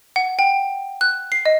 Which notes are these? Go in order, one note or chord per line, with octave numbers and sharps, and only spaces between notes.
F#5
G5
F#6
C7
D#5